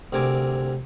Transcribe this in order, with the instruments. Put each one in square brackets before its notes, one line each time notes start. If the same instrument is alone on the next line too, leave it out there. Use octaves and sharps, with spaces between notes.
[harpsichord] D2 C3 A#4 G#5 D6